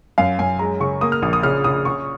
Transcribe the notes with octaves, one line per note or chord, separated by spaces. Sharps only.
F#2 F5
F#2 G#5
G#3 A#5
C#3 C#6
A#3 D#6
F6
A#1 D#6
D#6
C#3 F6
C#3 D#6
C#3 C#6